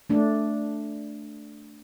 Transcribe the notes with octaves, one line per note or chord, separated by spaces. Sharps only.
A3 D4